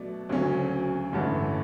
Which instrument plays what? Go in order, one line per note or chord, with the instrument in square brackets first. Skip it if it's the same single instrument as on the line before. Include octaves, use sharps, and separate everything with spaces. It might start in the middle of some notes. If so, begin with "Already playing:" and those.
Already playing: [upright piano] B2 F#3 A3 D4
D2 C#3 F#3 C#4
A1 G2 D3 A3 C#4